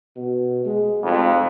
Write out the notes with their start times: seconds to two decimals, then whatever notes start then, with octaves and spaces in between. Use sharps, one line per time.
0.16 B2
0.65 G#3
1.03 F1 F2